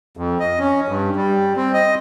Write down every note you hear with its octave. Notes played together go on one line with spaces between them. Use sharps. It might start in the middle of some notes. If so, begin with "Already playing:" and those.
F2
D#5
C#4
G2
G3
C4
D#5